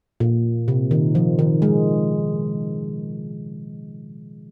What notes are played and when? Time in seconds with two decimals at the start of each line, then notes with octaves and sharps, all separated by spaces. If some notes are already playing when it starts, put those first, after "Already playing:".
0.20 A#2
0.68 C3
0.91 D#3
1.15 F3
1.39 D#3
1.62 G#3